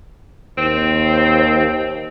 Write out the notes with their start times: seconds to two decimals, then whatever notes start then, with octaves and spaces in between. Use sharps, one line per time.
0.58 D#2 C4